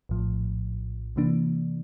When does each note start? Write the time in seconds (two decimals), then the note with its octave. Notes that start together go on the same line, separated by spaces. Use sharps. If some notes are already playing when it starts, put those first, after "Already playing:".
0.09 A#1 A2 F3
1.16 C3 E3 A#3 D4